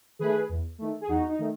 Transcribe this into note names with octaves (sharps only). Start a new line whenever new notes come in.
D#3 A3 G#4 B4
E2
D#3 A3
G#4
E2 D#4 F#4
D#4
D#3 A3